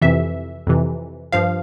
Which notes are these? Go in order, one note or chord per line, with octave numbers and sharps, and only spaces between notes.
F2 C3 E3 E5
F2 C3 E3
G2 F3 F5